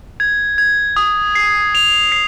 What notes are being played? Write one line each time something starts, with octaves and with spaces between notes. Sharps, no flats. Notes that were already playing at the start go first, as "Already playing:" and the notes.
G#6
G#6
D#6
C7
F7
C7